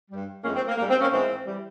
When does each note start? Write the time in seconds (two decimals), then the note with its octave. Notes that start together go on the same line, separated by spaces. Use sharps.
0.11 G2 G3
0.45 F2 E3 G#3 A#3 C#4
0.56 C4
0.67 A#3
0.78 G#2 G3 A#3
0.90 C4
1.01 A#3 C#4
1.12 G#2 E3 G#3 C4
1.46 E3 G3